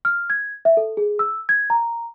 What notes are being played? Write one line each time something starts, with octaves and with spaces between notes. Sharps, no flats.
F6
G#6
E5
A4
G#4
E6
G#6
A#5